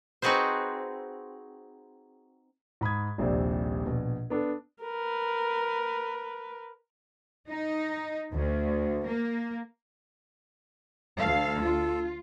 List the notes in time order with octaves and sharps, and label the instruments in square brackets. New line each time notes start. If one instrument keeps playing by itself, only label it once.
[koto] C4 D#4 F#4 G#4 B4 C5
[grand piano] G#2 B5 D#6 G#6
D#1 A#1 C3 C5 D5
A#1 B2
B3 D4 A4
[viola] A#4 B4
[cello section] D#4
D2
A#3
[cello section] D2 F5 [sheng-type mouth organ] A4
[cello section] F4